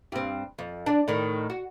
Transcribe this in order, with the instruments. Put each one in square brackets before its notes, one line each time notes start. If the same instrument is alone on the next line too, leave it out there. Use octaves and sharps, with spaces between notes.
[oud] G2 C4
F2
D4
A2 D#3
F#4